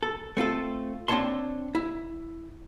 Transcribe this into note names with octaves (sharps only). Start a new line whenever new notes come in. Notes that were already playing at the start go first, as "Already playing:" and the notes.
A4
A3 C4 F4 A4
C4 D4 E4 C#5 A5 C6
E4